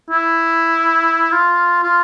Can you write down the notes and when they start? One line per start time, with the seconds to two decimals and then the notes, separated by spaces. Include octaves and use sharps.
0.10 E4
1.32 F4
1.84 F4